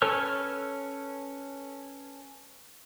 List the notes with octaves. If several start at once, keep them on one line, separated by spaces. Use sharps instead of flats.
C#4 A4 B4 C#5 F6